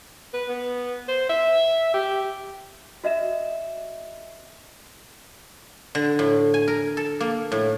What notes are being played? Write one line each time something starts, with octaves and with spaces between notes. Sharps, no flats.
B4
B3
C5
E5
G4
F#4 D#5 E5 E7
D3
A2
G#5
A#4
A4
A#3
A2